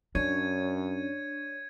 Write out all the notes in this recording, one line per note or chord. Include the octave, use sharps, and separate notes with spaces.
F#2 C#4 D4 C#5 G#6 C#7 D#7